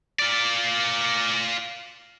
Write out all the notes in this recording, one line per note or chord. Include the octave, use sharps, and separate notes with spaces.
F4 D5